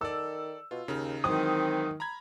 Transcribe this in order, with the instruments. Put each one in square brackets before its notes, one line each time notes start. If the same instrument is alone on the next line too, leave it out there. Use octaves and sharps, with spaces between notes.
[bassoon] D#3 [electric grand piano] A4 D5 [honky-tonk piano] E6
[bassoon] B2 [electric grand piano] F4
[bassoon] D#2 [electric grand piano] C#3 D#4 F6
[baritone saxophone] D#3 [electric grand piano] E3 F#3 G#3 [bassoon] C4 [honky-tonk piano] D#6
[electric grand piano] A#5 B5 G#6